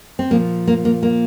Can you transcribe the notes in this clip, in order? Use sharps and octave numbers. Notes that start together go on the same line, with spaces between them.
C4
A#2 F3 A#3
A#3
A#3
A#3